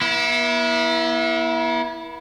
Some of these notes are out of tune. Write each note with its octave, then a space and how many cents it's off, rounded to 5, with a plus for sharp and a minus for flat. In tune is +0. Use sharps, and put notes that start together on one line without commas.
B3 -45 E4 +0